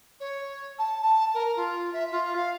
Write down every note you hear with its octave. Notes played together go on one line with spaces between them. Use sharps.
C#5
A5
A5
A#4
F4
E5
F4
F5